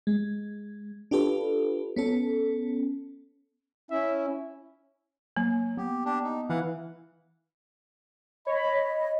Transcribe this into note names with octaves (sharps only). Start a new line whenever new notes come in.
G#3
D4 F4 G4 A4 B4
B3 C#4 A4
C#4 E4 E5
F#3 A#3
B3 G4
D4 G4
D#4
E3 F5 F#5
C#5 D#5 B5